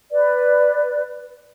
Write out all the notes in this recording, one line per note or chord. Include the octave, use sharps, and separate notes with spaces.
B4 D5